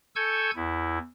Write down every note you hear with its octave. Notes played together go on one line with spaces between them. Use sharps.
A4 G#5 C#6 E6 G6 G#6
E2 E4